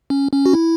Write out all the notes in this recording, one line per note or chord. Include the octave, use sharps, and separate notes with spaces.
C#4
C#4
F#4
E4